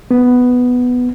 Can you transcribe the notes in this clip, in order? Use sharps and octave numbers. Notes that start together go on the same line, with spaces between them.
B3